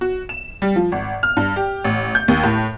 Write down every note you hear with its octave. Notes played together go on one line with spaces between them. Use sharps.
F#4
E7
G3
F3
G#1
F6
G2
G4
A1
G6
D#2
A2